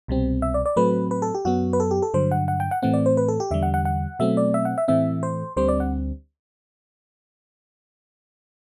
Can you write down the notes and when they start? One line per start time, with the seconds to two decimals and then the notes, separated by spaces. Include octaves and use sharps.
0.08 C2 B2 G3 C4
0.42 E5
0.54 D5
0.66 D5
0.76 A2 F#3 A3 C4 B4
1.11 B4
1.22 A4
1.35 G4
1.45 F#2 F#3 B3 F#4
1.73 B4
1.80 A4
1.91 G4
2.02 A4
2.14 G2 D3 F#3 C5
2.31 F#5
2.48 F#5
2.60 G5
2.71 F#5
2.82 A2 E3 A3 C4 F#5
2.94 D5
3.06 C5
3.17 B4
3.28 A4
3.40 G4
3.51 E2 D3 G3 E5
3.63 F#5
3.74 F#5
3.85 F#5
4.19 B2 F#3 A3 C4 E5
4.37 D5
4.54 E5
4.65 F#5
4.78 E5
4.88 A2 E3 A3 C4 E5
5.23 C5
5.57 D2 D3 G3 C4 C5
5.68 D5
5.80 F#5